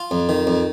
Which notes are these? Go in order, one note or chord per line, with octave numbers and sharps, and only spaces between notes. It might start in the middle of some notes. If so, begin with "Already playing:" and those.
Already playing: F4
F2
D#3
F2